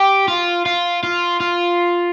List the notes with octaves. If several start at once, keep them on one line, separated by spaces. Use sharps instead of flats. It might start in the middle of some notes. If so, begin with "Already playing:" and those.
Already playing: G4
F4
F4
F4
F4